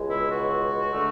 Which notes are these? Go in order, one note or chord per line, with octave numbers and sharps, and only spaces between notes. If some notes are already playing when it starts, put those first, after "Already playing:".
Already playing: C#2 B2 G#3
E4
F#4
D3 A3